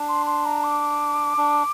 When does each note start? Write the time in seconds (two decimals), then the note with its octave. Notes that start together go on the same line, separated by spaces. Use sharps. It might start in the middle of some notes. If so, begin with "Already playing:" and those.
Already playing: D4
0.09 C6
0.27 C6
0.45 A#5
0.64 D6
1.37 D4